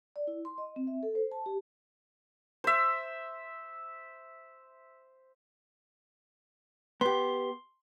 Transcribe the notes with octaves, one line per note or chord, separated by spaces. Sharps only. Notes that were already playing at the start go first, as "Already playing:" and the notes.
D5
E4
C6
D#5
C4
E5
A4
C5
A5
G4
C5 E5
B3 G4 C6